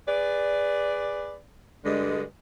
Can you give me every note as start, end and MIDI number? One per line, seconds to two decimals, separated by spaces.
0.07 1.38 68
0.07 1.38 71
0.07 1.38 74
1.85 2.23 43
1.85 2.23 50
1.85 2.23 56